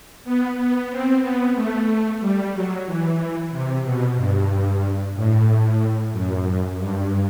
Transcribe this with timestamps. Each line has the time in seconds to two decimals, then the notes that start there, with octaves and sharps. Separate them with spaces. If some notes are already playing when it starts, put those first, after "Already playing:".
0.24 B3
0.57 B3
0.90 C4
1.22 B3
1.55 A3
2.21 G3
2.53 F#3
2.86 E3
3.51 C3
3.84 B2
4.16 G2
5.15 A2
6.12 F#2
6.78 G2